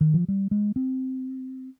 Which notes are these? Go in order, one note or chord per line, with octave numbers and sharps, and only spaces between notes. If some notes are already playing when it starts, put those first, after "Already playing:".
D#3
F3
G3
G#3
C4